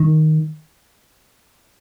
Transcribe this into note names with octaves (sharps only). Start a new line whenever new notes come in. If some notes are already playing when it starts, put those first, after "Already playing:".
Already playing: D#3